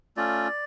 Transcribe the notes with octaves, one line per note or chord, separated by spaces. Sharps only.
A3 C#4 F4 D5